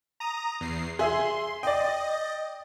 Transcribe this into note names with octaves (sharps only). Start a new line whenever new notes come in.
A#5 D#6
E2 C7
G#4 E5 G#5 C6
D5 D#5 G5